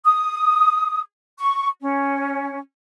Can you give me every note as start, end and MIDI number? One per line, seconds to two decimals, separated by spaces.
0.05 1.00 87
1.39 1.67 85
1.81 2.58 61